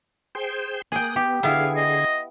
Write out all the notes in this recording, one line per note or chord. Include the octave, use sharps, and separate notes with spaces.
G#4 C5 G5
A#3 G#4 G5 D#6 F#6
B3 G4
D3 B3 E4 G#4 F5
D#5